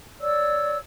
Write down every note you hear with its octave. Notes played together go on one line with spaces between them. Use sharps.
C#5 D5 E6